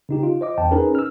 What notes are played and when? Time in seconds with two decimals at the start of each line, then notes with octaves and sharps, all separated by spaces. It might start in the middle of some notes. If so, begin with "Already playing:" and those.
0.09 C#3 D#4 G4
0.23 F4
0.41 C5 D#5 D6
0.58 E2 C5 G5 A5
0.71 C#4 D#4 G#4 A#4 B4
0.95 E6 F6